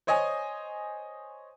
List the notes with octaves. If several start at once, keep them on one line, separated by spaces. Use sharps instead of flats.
C5 C#5 D#5 G#5 D#6